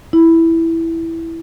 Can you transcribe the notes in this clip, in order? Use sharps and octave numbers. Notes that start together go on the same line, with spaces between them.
E4